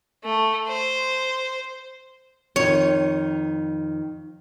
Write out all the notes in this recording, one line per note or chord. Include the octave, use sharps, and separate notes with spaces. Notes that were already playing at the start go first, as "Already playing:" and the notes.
A3
C5
F2 D#3 C#5